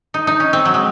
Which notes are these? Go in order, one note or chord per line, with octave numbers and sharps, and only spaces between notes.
D#4
D#4
C#4
C4
F#3
G#3